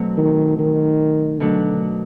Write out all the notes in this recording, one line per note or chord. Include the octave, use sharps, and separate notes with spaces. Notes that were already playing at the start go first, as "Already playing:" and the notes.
Already playing: B2 F#3 A3 C4
D#3
D#3
B2 D3 F#3 A3 D4